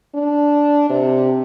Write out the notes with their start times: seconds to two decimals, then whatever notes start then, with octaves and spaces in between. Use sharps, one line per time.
0.15 D4
0.89 C3